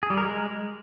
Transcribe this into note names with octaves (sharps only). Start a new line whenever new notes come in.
G#4
G3
A#4
G#3